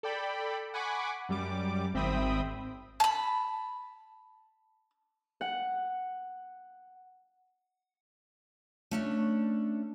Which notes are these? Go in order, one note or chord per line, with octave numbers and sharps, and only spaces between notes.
A4 D5 G5 B5
F#5 G#5 B5 C#6 D6
F#2 G3 D6
G#1 C4 E5 G5 B5 D#6
A5 B5
F#5
A3 C#4 D4